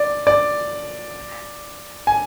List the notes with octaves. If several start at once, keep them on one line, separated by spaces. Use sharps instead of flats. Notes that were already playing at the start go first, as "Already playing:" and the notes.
Already playing: D5
D5
G#5